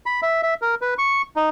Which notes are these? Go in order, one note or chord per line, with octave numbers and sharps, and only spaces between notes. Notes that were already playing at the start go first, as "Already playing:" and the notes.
B5
E5
E5
A#4
B4
C#6
D#4